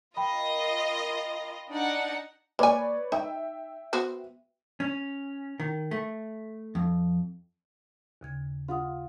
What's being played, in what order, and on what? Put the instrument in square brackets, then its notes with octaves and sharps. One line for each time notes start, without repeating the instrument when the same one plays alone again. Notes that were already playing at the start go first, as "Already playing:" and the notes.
[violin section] F4 A#4 D#5 [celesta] G5 B5
[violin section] D4 D#4 F#5
[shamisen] A#3 G#5 [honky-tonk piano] B4 C#5 D5
[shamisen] D#4 [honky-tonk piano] E5 G5
[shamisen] B3 F#4 C5
[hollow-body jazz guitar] C#4
D#3
A3
F2
[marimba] D#2 C#3 G#6
[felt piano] F4 [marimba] F5 F#5 D#6